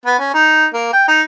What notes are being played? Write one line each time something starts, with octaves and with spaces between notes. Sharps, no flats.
B3
C#4
D#4
A#3
G5
D#4